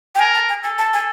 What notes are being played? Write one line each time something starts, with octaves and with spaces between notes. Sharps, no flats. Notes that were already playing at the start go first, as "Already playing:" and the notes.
G5
A#4 G#5
A5
G#5
A4 G#5
A5
G#5